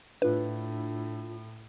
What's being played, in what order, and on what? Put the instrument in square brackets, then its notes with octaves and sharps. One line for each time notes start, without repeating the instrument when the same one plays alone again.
[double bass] A2 [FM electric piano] D4 F4 [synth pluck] B4